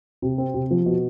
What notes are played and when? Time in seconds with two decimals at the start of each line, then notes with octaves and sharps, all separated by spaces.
0.22 C3
0.38 C4
0.54 C3
0.71 F3
0.86 B2